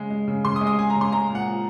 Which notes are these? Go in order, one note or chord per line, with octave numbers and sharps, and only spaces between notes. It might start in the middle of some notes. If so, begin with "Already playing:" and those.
Already playing: C#3 G#3
G#3
C#3
C#3 C6
D#6
G#3
D#6
G#3 G#5
A#5
C#3
C6
G#3 A#5
A#2
F#5
F3